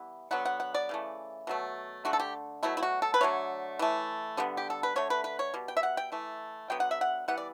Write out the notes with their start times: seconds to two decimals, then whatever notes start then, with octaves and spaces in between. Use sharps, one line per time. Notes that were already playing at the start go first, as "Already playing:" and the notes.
Already playing: E3 G3 B3
0.31 D3 F#3 B3 F#5
0.46 F#5
0.60 F#5
0.75 D5
0.89 C#3 E3 A3
1.47 B2 F#3 A3
2.05 D3 A3 F#4
2.13 A4
2.20 G4
2.63 B2 F#3 A3 E4
2.77 E4
2.83 F#4
3.02 A4
3.14 B4
3.21 D3 F#3 A3 C#5
3.79 E3 A3
4.37 D3 G3 B3
4.57 G4
4.70 A4
4.83 B4
4.96 D3 A3 C#5
5.10 B4
5.24 B4
5.39 C#5
5.54 B2 G3
5.68 G5
5.77 E5
5.83 F#5
5.97 G5
6.12 E3 A3
6.70 D3 F#3 B3 G5
6.80 F#5
6.91 E5
7.01 F#5
7.28 E3 G3 B3 F#5
7.38 D5